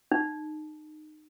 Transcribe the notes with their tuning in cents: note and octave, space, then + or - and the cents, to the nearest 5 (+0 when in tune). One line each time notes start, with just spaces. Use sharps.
D#4 -25